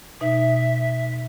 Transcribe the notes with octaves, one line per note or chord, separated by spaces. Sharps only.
B2 D#4 E5